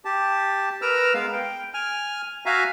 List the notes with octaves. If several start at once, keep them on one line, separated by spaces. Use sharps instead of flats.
G4 A5
A#4 B4 A#5 E6 F6
G#3 B3 F5
G5
G#5 F6
F#4 E5 F5 G#5 A#5